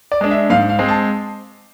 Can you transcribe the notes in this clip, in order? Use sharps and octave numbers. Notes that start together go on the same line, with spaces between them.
D5
G#3 D4
E5
G#2 F5
F5
G#3 C4
A5